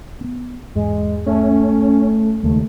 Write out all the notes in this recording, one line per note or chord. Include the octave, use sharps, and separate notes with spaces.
B3 C4
E2 G#2 G#3
A3 C#4
D#2 C#3 G#3 A3